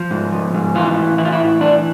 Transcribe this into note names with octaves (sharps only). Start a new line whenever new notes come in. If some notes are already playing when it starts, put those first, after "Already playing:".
Already playing: F3
G#2
F3
G#2
E3 F4
A2
E3 E4
F4
E4
A2
E3 D4